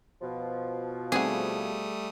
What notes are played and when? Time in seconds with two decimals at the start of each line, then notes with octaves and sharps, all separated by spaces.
0.22 B2 F3
1.12 G3 A3 C4 G#4 F#5 D#6